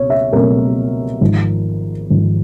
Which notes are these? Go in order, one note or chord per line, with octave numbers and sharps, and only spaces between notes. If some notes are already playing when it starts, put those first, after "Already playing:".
Already playing: C#2 B2 C4 C#5
E5
C#2 B2 F#3 A3 C4 A#4
G#1 G#2 F3
G#1 G#2 F3